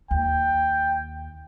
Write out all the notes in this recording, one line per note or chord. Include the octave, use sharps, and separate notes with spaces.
D#2 G5